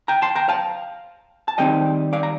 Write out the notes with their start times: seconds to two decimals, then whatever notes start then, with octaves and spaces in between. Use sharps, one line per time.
0.08 G5 A#5
0.22 A5 C6
0.35 G5 A#5
0.49 F5 A5
1.48 A5
1.58 D#3 G3 C4 D#4 D#5 G5
2.13 D5 F5
2.23 A#5